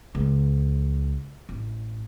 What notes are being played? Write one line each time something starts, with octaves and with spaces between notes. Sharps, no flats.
C#2
A1